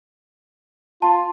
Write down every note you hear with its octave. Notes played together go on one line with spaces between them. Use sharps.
F4 A5